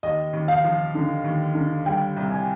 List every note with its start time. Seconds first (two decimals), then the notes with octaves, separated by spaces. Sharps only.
0.03 D#2 D#5
0.33 D#2
0.48 F5
0.64 F3
0.95 D3
1.24 D#2
1.55 D3
1.85 G3 G5
2.16 C2
2.30 G#5